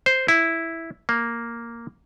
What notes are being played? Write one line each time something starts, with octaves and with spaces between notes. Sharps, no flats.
C5
E4
A#3